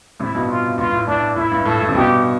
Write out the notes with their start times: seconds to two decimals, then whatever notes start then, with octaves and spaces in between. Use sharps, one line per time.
0.20 A2 C3 E4
0.34 G2 B2
0.49 F4
0.78 G2 F4
0.92 A2
1.07 A2 D4
1.36 A2 E4
1.52 G2
1.65 A2 A4
1.80 A2
1.89 C3
1.95 G2 B2 G4